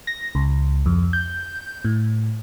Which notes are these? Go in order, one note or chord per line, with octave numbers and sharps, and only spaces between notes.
A#6
C#2
F2
G6
A2